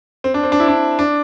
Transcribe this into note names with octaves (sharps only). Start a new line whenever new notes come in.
C4
D4
C4
D4
E4
D4
D4